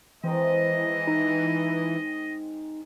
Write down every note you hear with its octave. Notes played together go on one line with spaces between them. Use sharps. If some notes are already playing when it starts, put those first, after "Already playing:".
D#3 E3 G#3 C4 D#5
D#4